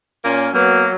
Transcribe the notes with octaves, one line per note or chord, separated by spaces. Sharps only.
A#2 A#3 C#4
F#3 A#3 B3